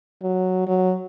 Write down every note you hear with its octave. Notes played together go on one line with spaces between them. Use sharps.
F#3
F#3